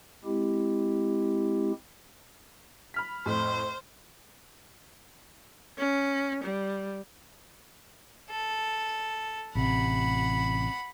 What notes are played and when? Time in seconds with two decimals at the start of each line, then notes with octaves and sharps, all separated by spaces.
0.25 G#3 C4 E4 G4
2.94 B5 F6 B6
3.26 F2 A2 C5
5.78 C#4
6.43 G3
8.30 A4
9.55 A1 C3 F#5 B5